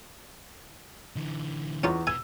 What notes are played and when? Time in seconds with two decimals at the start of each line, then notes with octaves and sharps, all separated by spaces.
1.16 D3 E3
1.84 E2 C#4 D#4 F4 C#6
2.07 B2 B3 G#5 E6